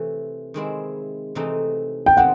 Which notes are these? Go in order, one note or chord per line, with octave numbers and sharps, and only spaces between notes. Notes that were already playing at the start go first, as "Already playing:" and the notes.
Already playing: C3 E3 A3 C4
D#3 G#3 C4 E4
C3 E3 A3 C4 D#4
G5
C3 D#3 G#3 C4 F#5